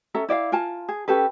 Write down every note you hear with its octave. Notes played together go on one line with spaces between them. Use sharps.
C#4 A4 E5 A#5
E4 D5 E5 F5
F4 A#4 G#5 A5
G#4
C#4 G4 A4 B4